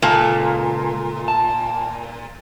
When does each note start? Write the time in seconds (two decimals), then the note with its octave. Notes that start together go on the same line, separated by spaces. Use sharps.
0.02 C#2 A#2 A4 A5
1.28 A5